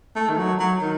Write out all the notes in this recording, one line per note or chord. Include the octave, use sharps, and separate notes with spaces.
A3
D#3
F#3
F#3
D#3